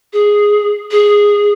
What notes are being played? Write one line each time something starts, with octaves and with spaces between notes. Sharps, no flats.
G#4
G#4